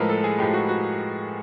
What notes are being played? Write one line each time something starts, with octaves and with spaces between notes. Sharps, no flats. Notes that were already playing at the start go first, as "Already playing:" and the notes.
Already playing: A2 F3 G#3 A#4 B4
A4
G#4
A2 F3 G#3 G4
F#4
F#4